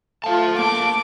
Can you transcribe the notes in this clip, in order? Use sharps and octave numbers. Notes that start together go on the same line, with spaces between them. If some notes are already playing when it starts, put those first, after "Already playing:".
A3 F4 F5 A5
A#3 A5 D6